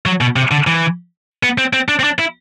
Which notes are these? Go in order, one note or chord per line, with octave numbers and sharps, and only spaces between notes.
F#3
B2
C3
D3
E3
B3
C4
C4
D4
C4
D4
E4